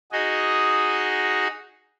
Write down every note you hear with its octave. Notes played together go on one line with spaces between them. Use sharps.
D#4 F#4 G#4 D#5